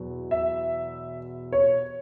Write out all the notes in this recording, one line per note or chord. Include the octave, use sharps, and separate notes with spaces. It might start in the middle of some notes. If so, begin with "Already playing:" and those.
Already playing: E2 B2 F#3
E5
C#5